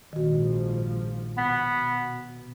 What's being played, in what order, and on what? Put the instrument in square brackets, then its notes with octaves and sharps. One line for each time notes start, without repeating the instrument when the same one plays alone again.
[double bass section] A#1 G#2 F3 [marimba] D#3 F#4
[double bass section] B2 [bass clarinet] B3